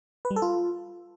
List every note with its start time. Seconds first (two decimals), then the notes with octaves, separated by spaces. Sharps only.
0.25 B4
0.31 G3
0.36 A4
0.42 F4